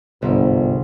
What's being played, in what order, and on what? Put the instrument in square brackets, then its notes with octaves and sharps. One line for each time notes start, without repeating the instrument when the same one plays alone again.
[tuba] G1 [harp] C2 G#2 D3